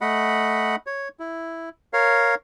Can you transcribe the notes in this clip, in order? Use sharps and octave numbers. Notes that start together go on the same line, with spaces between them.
A3 D#5 F#5 B5
C#5
E4
A#4 C#5 F5